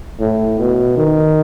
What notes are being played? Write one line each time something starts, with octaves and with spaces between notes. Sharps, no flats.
A2
B2
D#3